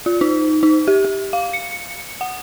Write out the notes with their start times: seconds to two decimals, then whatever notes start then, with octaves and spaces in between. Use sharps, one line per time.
0.06 F4
0.21 D#4
0.63 D#4
0.87 G4
1.05 G4
1.33 F5
1.53 C#7
2.21 F#5